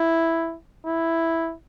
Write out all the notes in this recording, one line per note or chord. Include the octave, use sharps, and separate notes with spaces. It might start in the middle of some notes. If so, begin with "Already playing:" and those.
Already playing: E4
E4